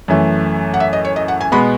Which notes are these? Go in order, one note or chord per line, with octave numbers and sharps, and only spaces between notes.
F#2 E3 A3
F#5
E5
D#5
C#5
D#5
F#5
G#5
B2 G#3 B3 B5